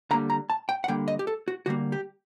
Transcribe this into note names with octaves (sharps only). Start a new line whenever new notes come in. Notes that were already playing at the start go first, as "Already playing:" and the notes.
D3 G3 A#3 A#5
A#5
A5
G5
F#5
D3 G3 A#3 G5
D#5
G4
A4
F#4
D3 G3 A#3 F#4
G4